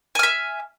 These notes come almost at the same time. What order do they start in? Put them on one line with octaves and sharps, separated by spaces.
G#5 F6 E5